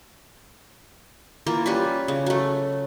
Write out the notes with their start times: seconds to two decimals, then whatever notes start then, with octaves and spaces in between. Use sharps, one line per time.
1.46 E3 A#3 F4
1.66 G3 C#4 F4 B4
2.08 C#3
2.26 F#3 A3